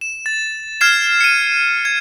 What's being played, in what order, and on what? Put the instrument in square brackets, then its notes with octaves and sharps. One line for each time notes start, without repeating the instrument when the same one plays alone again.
[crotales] E7
A6
F6 G#6 C7 E7
C#7 D#7
G#6